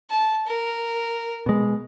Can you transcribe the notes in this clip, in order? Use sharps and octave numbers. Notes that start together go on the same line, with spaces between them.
A5
A#4
B2 G#3